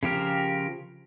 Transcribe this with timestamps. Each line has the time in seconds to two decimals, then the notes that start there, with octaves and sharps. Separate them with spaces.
0.03 C#3 F3 G4 A#4